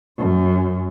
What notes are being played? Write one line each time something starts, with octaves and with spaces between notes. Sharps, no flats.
F#2